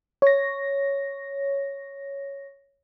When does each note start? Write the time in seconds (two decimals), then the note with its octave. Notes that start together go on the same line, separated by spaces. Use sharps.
0.22 C#5 A#6